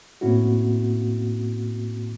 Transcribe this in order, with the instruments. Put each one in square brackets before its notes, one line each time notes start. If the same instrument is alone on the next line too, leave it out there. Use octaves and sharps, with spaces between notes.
[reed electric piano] A2 A#3 C4 C#4 E4 F#4